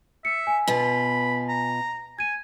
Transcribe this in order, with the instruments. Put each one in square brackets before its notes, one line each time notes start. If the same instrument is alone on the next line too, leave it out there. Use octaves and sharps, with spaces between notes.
[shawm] E5 [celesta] C#7
[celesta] G#5
[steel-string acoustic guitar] B2 F4 [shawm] B5
[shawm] A#5
[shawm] G#5 [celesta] G#6 D#7